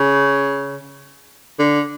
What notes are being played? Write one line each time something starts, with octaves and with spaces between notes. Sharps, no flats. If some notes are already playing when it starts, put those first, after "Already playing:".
Already playing: C#3
D3